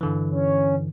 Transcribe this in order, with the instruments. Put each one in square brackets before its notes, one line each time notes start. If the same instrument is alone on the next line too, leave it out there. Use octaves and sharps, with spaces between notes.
[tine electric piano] G2 D3 E3
[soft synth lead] C#4